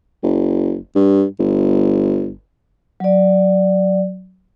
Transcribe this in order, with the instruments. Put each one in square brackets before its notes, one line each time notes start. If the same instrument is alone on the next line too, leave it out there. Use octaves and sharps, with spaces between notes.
[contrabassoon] F#1
G2
G1
[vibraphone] F#3 D5